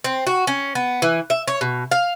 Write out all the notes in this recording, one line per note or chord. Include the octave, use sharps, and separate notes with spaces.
C4
F#4
C#4
B3
E3
E5
C#5
B2
F5